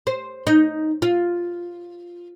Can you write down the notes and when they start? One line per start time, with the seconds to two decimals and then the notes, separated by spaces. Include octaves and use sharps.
0.07 C5
0.47 D#4
1.02 F4